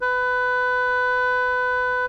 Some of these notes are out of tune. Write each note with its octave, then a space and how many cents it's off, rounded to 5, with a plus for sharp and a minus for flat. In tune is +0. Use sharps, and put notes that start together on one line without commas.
B4 +20